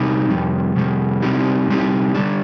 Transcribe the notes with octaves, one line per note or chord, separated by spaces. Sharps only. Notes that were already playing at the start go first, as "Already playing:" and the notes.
Already playing: C3 G3 C4 D#4
F2 C3 G3
F2 C3 G3
C3 G3 C4 D#4 G4
C3 G3 C4 D#4 G4
D3 G3 D4